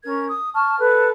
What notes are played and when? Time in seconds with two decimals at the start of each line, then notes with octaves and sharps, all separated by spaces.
0.03 C#4 A#4 G#6
0.29 D#6
0.54 A5 C#6 F6
0.78 A4 B4